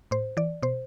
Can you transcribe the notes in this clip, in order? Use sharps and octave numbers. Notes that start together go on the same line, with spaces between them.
A2 C5
E3 D5
B2 C5